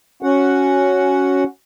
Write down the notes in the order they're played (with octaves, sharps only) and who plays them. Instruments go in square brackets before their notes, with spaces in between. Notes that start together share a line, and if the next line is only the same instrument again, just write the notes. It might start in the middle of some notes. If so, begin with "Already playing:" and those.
[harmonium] C#4 F#4 F#5